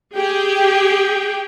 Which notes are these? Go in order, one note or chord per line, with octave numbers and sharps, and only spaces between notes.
G4 G#4 G5